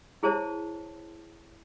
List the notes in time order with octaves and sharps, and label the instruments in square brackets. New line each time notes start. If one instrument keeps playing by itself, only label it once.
[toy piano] E4 G#4 C5 C#5 A5